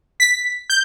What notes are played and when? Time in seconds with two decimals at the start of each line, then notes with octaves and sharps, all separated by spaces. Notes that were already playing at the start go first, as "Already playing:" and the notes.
0.20 B6
0.70 G6